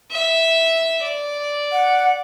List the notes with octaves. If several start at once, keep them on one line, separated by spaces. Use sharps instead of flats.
E5
D5
F#5